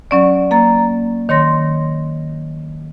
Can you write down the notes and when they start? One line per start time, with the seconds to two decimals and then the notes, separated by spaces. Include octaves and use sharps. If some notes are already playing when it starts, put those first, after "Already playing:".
0.11 F#3 C#4 D5
0.51 A#3 A#5 A6
1.29 D#3 C#5 C6 A#6